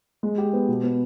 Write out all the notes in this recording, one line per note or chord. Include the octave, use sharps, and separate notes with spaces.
G#3
G4
B3
B2
B3